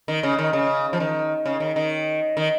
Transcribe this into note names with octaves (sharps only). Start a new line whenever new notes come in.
D#3
C#3
D#3
C#3
F3
D#3
C#3
D#3
D#3
D#3